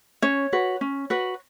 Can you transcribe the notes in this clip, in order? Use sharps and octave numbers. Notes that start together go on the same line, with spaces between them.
C#4 C#5
F#4 B4
C#4
F#4 B4